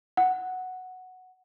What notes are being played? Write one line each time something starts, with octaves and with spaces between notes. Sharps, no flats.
F#5